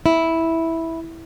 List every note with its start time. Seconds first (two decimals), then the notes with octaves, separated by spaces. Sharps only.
0.06 E4